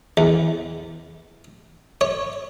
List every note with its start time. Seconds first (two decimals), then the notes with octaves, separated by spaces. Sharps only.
0.17 E2
2.01 C#5